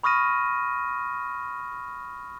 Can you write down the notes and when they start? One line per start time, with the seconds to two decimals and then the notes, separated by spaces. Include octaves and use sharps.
0.03 B5 C#6 D#6 F6 A#6 D#7